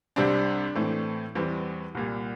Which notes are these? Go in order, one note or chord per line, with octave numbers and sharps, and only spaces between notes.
C2 C3 G3 C4 D4
A2 E3 A3 C4
E2 E3 G3 C4
C2 A#2 G3